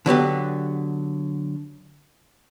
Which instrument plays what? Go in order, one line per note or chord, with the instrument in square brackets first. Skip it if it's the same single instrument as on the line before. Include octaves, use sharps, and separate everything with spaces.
[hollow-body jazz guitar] D3 F#3 B3 G4